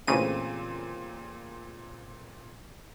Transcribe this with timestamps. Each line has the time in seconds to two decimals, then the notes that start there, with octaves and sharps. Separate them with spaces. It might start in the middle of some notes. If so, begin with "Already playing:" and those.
0.07 A1 A#2 C#3 C4 D#7